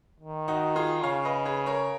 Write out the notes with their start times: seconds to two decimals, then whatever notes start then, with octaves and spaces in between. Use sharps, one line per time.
0.20 D#3
0.48 D#4 F#4
0.76 F4 G#4
1.03 C#3 C#5 F5
1.25 B4 D#5
1.45 G#4 B4
1.66 A#4 C#5